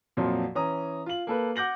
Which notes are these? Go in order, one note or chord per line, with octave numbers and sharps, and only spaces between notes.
F2 A#2 F3 F#3
E3 C#4 A#5 D#6
F4 F#7
A#3 A4 B4
F#5 D6 G6 A#6 F#7